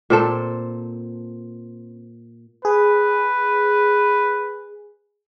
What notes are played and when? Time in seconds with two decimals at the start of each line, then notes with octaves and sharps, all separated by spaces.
0.10 A#2 C4 A4
2.65 G#4 B4